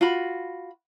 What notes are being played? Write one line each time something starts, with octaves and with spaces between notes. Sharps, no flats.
F4 F#4 B5